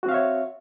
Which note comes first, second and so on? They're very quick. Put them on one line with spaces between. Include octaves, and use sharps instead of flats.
F#4 C4 F5 E5 C#5